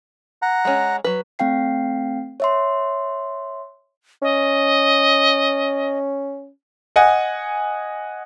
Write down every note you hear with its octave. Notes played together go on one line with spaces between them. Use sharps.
F#5 A#5
G#3 C#4
F#3 B4
A3 C4 F5 G5 C7
C#5 E5 C6
C#4 D#5
D#5 F#5 G#5